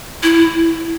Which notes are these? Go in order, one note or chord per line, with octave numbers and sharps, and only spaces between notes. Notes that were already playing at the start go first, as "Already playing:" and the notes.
E4